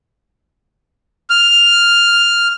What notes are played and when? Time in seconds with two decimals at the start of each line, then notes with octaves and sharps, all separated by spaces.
1.30 F6